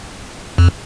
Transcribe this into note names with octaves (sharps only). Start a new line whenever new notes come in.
F2